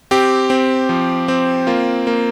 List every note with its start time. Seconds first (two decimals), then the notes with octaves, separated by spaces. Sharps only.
0.11 C4 G4
0.50 C4
0.89 F3
1.28 C4
1.67 A#3 F4
2.07 A#3